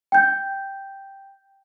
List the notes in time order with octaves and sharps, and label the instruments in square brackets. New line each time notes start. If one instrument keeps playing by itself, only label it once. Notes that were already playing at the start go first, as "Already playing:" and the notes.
[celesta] G5 G6